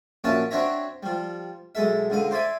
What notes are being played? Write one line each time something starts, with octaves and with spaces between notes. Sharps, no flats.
A#1 A#2 C#4 F#4 E5 A5
C4 D4 F#4 C#5 E5 A#5
F3 G3
B1 G#3 A4 E5
C#2 D3 D#5
C5 D5 E5 G#5